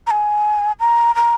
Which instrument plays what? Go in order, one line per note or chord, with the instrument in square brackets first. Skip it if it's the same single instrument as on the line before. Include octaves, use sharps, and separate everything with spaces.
[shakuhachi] A#5
G#5
A#5
A#5